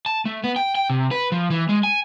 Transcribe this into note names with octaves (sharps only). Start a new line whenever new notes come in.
A5
A3
B3
G5
G5
C3
B4
F3
E3
G#3
G#5